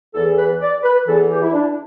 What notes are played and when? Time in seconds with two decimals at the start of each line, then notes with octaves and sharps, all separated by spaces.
0.15 E2 E3 A4
0.37 B4
0.61 D5
0.83 B4
1.07 E2 E3 A4
1.30 G4
1.42 E4
1.53 D4